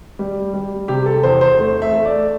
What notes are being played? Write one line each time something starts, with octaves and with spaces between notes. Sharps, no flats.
G3
G3
C3 G4
A4
E2 C5
C5
A3
E5
A3
D5